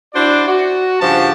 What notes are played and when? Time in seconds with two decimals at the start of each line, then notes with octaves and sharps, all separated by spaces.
0.14 D4 E4 F#4 C5 D5
0.48 F#4
1.01 G2 C#3 F3 F#4 G4 A5